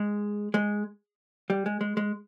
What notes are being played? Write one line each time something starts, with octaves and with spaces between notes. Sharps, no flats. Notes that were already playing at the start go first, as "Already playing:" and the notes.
Already playing: G#3
G#3
G3
G#3
G#3
G#3